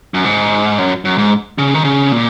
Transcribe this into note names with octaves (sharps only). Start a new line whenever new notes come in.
F#2
G#2
F#2
F#2
G#2
C#3
D#3
C#3
A#2